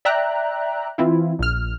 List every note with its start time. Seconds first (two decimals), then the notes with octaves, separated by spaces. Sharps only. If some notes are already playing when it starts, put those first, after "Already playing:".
0.05 D5 E5 G5 A#5 F#6
0.98 E3 C4 E4 F4
1.39 A#1 F6